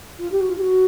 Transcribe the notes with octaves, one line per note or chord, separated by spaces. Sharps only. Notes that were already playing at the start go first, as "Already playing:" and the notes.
F4
G4
F#4
F4
G4
F#4